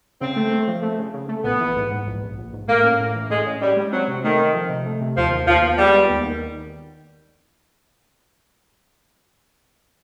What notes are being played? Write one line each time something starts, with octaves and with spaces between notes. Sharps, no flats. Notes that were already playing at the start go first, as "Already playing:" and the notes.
C#3 C4
A3
A3
F3
A3
C#3
C#3
A3
A#1 B3
E3
G#2
G#2
A#1
A#1
A#1
G#2
A2 A#3
C#4
A2
E3
A2 G#3
C#4
G3 C#4
G#3
F#3 C4
C3
D#3 A3
C4
F3
C3
A3
C3
D#2 F3
D#3
D#2 F3
B3
G3 G#3
B3
D#2
D#3